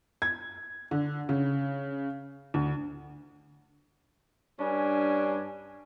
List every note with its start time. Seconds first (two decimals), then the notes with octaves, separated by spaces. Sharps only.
0.22 G#6
0.91 D3
1.29 C#3
2.54 D2
4.59 G2 C#4 D4 G#5